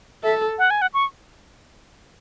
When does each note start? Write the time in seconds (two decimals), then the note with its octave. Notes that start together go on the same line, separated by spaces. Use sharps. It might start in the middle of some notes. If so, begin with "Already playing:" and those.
0.23 A4 E5
0.58 F#5
0.70 G#5
0.82 F#5
0.94 C#6